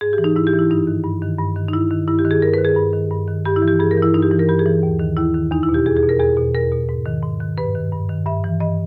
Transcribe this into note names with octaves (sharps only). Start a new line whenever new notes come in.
G#2 G#4
G4
E3
D#4
G#2 E4
G4
E3
E4
G2 D#4
D#3
G2
D#3
G2
D#3
D#4
G2 E4
D#3
G2 E4
G4
D#3
G#4
G2 A#4
D#3 B4
G#4
G2
D#3
G2
D#3
G2 G4
E4
E3
G4
G2 G#4
A#4
E3
E4
G2 D#4
G4
E3
A#4
G2 G4
G#4
E3
D#2
D#3
D#2 E4
D#3
E2 D#4
E4
B2
G4
E2 G#4
G#4
B2
A#4
E2 G#4
B2
E2 A#4
B2
G#2
D#3
G#2
D#3
G2 B4
D#3
G2
D#3
G2 E5
E3
G2 D#5